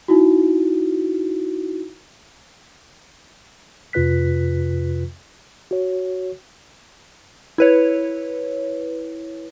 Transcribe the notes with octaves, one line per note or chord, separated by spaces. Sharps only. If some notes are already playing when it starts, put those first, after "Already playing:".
D#4 E4 F#4
F2 C3 F4 B4 F#6 B6
F#4 C#5
E4 B4 C#5